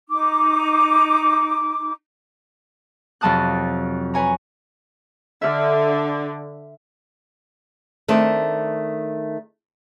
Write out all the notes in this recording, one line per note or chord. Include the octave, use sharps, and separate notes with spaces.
D#4 D6
F2 C3 F#3 A5 D#6 F#6
B4 C#5 G#5 A#5
D3 E5 F6
D#3 A3 C4 D4